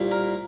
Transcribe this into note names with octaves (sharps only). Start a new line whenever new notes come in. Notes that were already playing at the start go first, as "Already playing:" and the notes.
Already playing: C2 A#2 G3
A#4